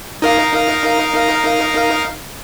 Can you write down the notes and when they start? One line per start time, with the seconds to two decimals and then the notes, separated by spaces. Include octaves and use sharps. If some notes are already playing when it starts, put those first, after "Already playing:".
0.22 D#4 A#4 F5